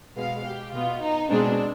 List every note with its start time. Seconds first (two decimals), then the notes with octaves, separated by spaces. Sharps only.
0.16 B2 G#3 B3 F5
0.44 G4
0.73 B2 B3 F4
1.01 D#4
1.29 B2 G#3 C4 D4